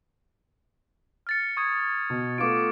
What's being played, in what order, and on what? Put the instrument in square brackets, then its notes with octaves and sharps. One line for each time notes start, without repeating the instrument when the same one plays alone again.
[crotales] F6 A6 C#7
C#6 D#6 G#6
[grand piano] B2
[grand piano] A3 B3 F4 [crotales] D6 D7